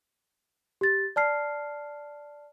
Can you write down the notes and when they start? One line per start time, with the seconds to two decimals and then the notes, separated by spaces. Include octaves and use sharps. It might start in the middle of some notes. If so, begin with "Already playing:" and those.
0.81 G4 A6
1.16 D5 A5 F6 C7